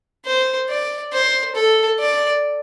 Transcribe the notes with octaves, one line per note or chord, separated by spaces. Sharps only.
C5
D5
C5
A4
D5